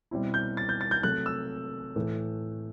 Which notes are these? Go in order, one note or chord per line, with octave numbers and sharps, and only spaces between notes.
B2 G3 C4 E4
G6
A6
G6
A6
G6
C3 F#3 A3 F#6
E6
A2 E3 A3